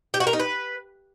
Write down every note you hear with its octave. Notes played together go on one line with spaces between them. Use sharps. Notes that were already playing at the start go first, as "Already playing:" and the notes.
G4
F#4
A#4
D#4
B4